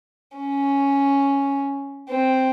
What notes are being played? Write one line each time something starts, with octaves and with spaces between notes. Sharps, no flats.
C#4
C4